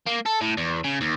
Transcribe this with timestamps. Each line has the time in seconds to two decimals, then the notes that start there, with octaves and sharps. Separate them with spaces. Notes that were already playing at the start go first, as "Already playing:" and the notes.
0.06 A#3
0.26 A4
0.41 A2
0.57 E2
0.84 C#3
1.01 D#2